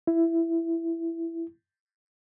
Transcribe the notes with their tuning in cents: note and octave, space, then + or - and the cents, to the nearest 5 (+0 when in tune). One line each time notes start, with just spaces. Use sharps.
E4 +10